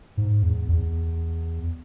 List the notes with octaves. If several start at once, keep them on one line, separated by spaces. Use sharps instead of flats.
G#2
E2
E2